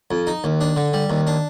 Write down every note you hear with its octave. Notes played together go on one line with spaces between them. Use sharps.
F2
D#4
D#2
D4
D3
G3
D#2
D4